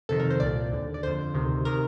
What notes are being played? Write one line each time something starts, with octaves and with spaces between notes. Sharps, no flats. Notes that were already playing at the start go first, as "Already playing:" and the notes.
F2 C3 D#3 A4
A#4
C5
C2 A#2 D5
D#2 D3
D5
F2 D3 C5
D2 C3 D#3
C3 D#3 A#4